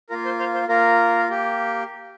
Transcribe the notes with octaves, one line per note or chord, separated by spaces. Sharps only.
A#3 F4 A#4
C5
C5 F5
C5
A#3 F4 A#4
A#3 G4